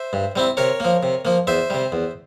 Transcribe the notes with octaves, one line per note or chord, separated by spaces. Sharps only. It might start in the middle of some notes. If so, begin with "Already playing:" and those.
Already playing: C5 E5
G2
G3 C4 E4
C3 A#4 C#5
F3 A#3
C3
F3 A#3
E2 C5 E5
C3 G3
E2